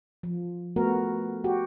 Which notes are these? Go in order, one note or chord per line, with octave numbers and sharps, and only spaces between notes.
F3
A3 B3 F#4 A#4
F#4 G4